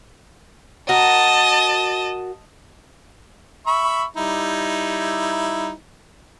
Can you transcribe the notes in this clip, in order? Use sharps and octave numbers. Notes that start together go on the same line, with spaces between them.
F#4 A#4 D#5 A5
E5 B5 C#6
G3 D#4 E4